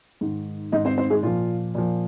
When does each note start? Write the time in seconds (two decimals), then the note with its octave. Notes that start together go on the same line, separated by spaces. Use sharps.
0.21 G#2 D#3
0.72 G#2 D#3 D#4 D#5
0.85 C4 C5
0.98 C4 C5
1.10 G#3 G#4
1.23 A#2 F3 F4
1.75 A#2 F3